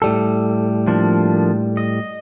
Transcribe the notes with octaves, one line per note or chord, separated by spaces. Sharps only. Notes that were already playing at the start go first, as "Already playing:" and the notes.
A2 G3 A4
F3 A#3 D4
D#5